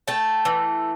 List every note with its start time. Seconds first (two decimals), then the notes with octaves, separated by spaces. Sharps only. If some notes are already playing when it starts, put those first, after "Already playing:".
0.08 A3 G5 A5
0.45 E3